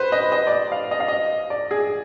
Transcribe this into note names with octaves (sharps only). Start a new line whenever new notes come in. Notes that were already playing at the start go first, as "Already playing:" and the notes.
Already playing: B4 C5
D#5
D#5
D5
D#5
F5
D#5
F5
D#5
D5
G#4